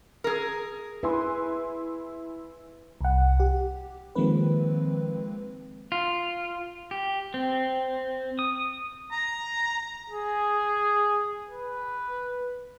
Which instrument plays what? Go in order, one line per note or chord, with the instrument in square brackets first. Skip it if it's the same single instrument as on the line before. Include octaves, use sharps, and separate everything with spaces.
[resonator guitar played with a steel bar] G#4 A#4
[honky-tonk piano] E4 G#5 C6 [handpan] B4
[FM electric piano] C2 F#5
G4
D#3 F3 G#3 A#3 C4 B4
[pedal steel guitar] F4
G4
C4
D#6
[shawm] A#5
[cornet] G#4
B4